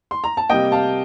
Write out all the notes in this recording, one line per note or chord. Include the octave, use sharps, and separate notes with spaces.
C6
A#5
A5
C3 G3 A#3 D#5 G5
F5 A5